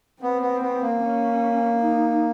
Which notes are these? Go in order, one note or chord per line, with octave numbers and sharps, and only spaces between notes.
B3 C4
B3
B3
A#3
C#4
D#4